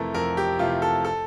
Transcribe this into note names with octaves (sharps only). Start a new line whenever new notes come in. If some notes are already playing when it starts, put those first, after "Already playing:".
Already playing: F2 C3 E3 A3 A4 A#4
F2 A#4
G4
C3 E3 A3 F4
A4
A4